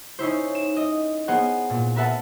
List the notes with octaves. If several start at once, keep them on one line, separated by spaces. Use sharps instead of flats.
C#4 D#4 E4 C5
E7
D#5
B3 G#4 A#4 C5 F#5
A#2
A#4 B4 E5 F#5 A5